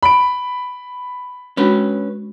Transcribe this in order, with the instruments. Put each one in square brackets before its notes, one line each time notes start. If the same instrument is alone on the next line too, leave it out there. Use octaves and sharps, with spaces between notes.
[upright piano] B5 D7
[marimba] G#3 D4 F#4 [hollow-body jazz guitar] C#4 B4